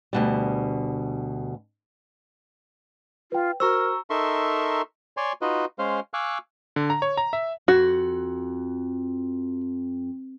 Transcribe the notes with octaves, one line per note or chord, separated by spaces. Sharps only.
D2 B2 G3
F4 B4 G5
F#4 A#4 C5 A#5 C#6 E6
D#4 A4 A#4 E5 C6 C#6
C#5 D5 G#5 C6 C#6
D#4 F4 F#4 B4 D#5
G#3 C#4 C5 F5
F5 G#5 C#6 D6 E6 F#6
D3
A#5
C#5
A#5
E5
F2 F#4